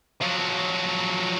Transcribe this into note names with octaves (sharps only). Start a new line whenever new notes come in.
F3 F#3